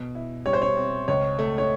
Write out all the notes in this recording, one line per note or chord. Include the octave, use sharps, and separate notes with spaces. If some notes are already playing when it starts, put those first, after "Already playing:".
Already playing: B2
E4
G3 C#5
C5
C#5
C4
C#2 C#5
A3
C#5